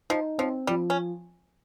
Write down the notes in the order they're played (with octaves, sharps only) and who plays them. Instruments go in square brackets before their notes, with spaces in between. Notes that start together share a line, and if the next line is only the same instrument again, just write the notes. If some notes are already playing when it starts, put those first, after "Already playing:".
[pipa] F3 [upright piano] D#4
[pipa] F3 [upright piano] C4
[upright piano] F3 [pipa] G3
[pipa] C#4